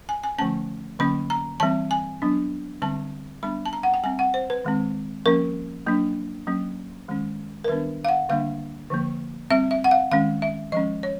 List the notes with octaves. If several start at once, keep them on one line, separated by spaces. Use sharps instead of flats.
G#5
G#5
D3 F3 A3 C#4 A5
D3 F#3 A#3 C#4 B5
A#5
E3 G3 C4 A5
G#5
F#3 B3 D4
D3 G3 C4 A5
G3 B3 D4 B5
A5
A#5
F#5
G5
G3 C4 G#5
F#5
C5
B4
D#3 G#3 C4
F3 A#3 C#4 A#4
F#3 A#3 D4
F#3 A#3 C#4
D#3 G#3 C#4
A#4
D#3 G3 B3 D4 B4
F5
F#5
D3 G3 A#3 D4 F5
D3 F3 A#3
G3 C4 E5
E5
F#5
F5
D#3 G#3 C#4 F5
E5
F3 G#3 C#4 D#5
C#5